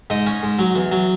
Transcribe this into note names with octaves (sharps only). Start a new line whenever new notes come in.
G#2 D#4 D#5
C#4
G#2
F#3
E2
F#3